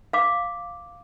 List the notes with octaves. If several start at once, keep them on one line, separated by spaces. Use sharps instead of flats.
F5 D6